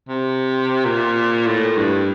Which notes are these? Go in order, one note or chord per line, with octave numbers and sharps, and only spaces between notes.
C3
A#2
A2
G2